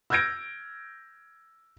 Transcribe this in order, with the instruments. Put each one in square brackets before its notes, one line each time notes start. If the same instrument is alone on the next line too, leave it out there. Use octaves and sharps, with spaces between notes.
[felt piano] E6 F6 G6 G#6 A#6 D7